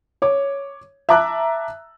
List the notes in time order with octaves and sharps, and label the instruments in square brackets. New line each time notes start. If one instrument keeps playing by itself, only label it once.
[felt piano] C#5 D6
E5 A5 A#5 D6 E6 F#6